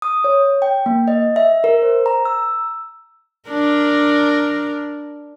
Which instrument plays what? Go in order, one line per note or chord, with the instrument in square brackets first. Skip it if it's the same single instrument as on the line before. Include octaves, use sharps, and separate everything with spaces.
[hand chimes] D#6
C#5
G5
A#3
D#5
E5
A#4
C5
A#5
E6
[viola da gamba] D4 A#4